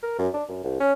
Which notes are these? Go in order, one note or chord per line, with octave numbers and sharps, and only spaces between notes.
A#4
F#2
D4
F#2
C2
C#4